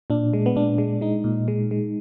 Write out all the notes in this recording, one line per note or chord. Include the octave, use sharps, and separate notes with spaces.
A#2 D4
G#3
B3
A#2 D4
G#3
G#3 D#4
A#2
G#3
G#3